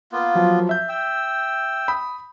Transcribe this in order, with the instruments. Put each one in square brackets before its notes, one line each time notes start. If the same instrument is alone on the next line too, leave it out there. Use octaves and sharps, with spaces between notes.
[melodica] A#3 B3 F4
[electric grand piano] F3 F#3
E5 G6
[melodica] G5 E6
[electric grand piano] B5 D#6